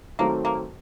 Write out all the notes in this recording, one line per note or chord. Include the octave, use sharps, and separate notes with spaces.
D#3 F#3 A3 A#3 C4
A#3